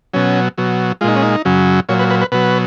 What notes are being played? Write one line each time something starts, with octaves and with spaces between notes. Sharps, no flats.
B2 F#3 C#4
B2 F#3
A#2 G#3 D#4 F4
C#4
D#4
F#2 C#3 F#3
A#2 F#3 C#5
B4
B4
B4
B2 F#3 B4